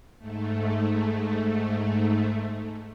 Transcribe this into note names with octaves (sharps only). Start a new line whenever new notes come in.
G#2 A3